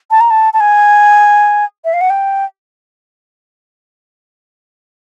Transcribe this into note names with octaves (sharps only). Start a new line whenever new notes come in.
A5
A#5
A5
A5
G#5
E5
F5
F#5
G5